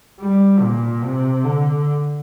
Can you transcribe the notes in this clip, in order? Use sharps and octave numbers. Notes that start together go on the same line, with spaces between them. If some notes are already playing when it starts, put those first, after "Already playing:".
G3
A#2
C3
D3